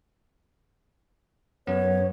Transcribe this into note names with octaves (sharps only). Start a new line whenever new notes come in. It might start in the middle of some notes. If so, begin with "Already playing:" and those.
F#2 B3 C#5